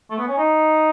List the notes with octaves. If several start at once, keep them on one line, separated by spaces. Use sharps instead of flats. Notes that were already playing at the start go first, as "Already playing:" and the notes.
A3
B3
C#4
D#4